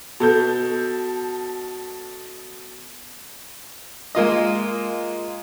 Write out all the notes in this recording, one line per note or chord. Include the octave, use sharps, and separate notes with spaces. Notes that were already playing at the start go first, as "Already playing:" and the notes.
B2 A4 G6
G#3 A#3 F4 D#5